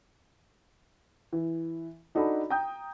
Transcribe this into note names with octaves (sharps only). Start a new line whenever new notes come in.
E3
D4 D#4 F#4 A4 B5
G5 A#5 D#6 G6